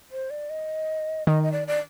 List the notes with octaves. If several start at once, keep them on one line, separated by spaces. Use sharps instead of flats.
C5
D5
D#5
D#3 D#5
D#5
D5
D5